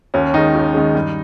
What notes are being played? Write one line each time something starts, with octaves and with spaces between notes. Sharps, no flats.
D#2 C#4
D#3 G#3 D#4
D#2
D#3 G#3
G2